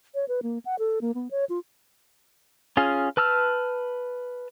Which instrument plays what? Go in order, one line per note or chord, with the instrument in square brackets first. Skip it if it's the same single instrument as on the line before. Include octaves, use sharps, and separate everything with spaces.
[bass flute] C#5
B4
A#3
F#5
A4
A#3
B3
C#5
F4
[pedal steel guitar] C#4 F4 G#4
B4 A5 E6 F6